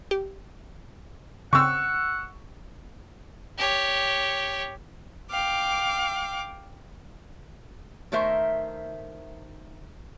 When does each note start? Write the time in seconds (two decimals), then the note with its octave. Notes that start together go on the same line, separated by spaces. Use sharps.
0.11 G4
1.53 C#3 C4 F#5 C#6 E6
3.58 G4 C#5
5.30 F5 G5 D6
8.12 D#3 A3 A#4 C5 E5